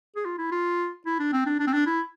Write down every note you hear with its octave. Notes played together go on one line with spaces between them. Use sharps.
G#4
F4
E4
F4
E4
D4
C4
D4
D4
C4
D4
E4